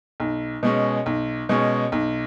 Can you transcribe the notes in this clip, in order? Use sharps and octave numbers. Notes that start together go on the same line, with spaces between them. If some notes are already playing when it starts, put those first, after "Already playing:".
B1
B2 G#3 C#4
B1
B2 G#3 C#4
B1